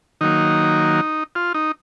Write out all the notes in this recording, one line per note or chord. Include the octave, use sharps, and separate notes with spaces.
D#3 F#3 A#3 D#4
F4
D#4